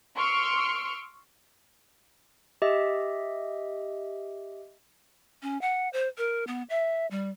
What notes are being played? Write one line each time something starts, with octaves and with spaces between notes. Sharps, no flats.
C6 C#6 E6 F6 C#7 D7
G4 D#5 E5
C#4
F#5
C5
A#4
B3
E5
G3